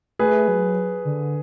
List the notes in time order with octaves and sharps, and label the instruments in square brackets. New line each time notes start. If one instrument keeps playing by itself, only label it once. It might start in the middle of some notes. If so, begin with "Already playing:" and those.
[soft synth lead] A3 [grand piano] G#4 B4
[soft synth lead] F#3
D3